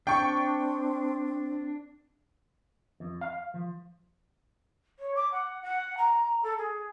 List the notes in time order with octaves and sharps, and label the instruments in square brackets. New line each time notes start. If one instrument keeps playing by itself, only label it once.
[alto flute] C4 [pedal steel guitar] D4 [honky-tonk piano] G5 C#6
[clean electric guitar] F2
F5
F3
[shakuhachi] C#5
D6
F#5
F#5
A#5
A4
G#4